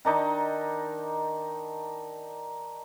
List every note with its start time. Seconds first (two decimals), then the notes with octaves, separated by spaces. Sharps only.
0.05 D#3 D4 D#4